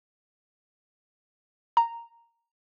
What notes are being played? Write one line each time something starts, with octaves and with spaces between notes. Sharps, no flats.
A#5